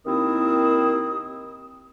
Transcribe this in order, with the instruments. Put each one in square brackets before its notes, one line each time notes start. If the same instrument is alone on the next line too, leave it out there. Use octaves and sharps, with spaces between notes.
[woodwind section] D#2 D#3 C4 E4 D#6